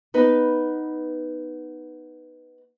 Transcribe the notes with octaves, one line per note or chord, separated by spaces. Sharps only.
B3 D#4 B4